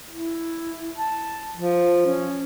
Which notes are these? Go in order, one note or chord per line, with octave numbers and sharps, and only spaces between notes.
E4
A5
F3
C#4